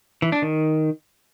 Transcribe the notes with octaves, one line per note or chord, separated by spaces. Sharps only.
E3
D4
D#3